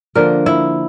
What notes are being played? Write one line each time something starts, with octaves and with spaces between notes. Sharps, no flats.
D3 F3 A#3 A#4
E4